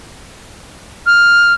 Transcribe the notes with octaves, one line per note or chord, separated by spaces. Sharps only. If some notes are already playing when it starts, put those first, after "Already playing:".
F6